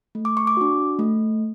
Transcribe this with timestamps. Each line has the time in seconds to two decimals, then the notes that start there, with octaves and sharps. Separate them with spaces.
0.15 A3
0.25 D6
0.37 C#6
0.47 D6
0.57 D4 F#4
0.99 A3